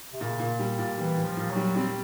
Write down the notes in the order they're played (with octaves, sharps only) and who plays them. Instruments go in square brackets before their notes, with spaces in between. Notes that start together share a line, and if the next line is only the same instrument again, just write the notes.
[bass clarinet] C3
[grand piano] A#2 [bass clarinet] C#3
[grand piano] A#2
G3
A#2
[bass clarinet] E3 [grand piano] G3
[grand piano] A#2
[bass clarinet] F3
[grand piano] A#2
[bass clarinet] F#3
[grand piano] G3
[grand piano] G3 [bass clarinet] C4